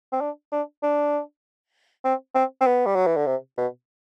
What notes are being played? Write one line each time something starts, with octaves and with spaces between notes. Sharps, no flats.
C4
D4
D4
D4
C4
C4
C4
B3
G3
F#3
E3
D3
C3
B2